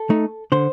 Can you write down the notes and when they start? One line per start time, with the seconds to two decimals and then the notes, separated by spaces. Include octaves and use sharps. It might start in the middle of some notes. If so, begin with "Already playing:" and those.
Already playing: A4
0.10 A3 D#4
0.52 D3 C5